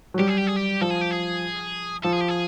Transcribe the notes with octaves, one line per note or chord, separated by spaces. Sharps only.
F#3
G3 G4
G#4
G4
G#4
G4
F3 A4
G#4
G4
G#4
F3 A4
G#4
G4
G#4